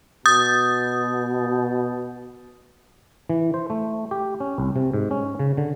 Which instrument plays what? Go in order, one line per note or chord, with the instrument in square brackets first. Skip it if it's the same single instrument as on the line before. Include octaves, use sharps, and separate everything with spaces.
[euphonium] B2 [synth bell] D#6 G6 A6
[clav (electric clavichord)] E3
C5
A3
G4
C#4
C2
C3
G#2
C#4
C#3
D3